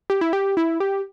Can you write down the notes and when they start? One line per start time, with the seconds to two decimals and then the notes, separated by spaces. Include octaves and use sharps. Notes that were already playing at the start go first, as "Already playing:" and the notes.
0.10 G4
0.21 E4
0.33 G4
0.57 E4
0.80 G4